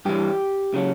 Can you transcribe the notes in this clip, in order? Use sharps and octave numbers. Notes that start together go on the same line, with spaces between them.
G2 E3 G4
C#3 F#3